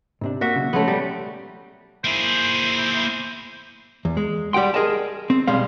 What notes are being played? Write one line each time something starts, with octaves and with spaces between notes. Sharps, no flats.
G#2 C3 D4
A#3 F#4 E5
B1 C#3
F3 G#3 A3 B3 C#4
G3 A#5
A#3 E4 G#4 C5
E2
G#3
G3 G4 F#5 G5 C6
G#4 A#4 D#5 G#5 A5
C4
B1 G3 G#3 C5 F5